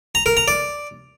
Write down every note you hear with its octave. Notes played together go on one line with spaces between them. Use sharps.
A#5
A#4
A#5
D5